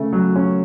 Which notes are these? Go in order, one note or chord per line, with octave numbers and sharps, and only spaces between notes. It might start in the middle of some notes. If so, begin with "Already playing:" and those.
Already playing: C#3 A3
F#3
C#4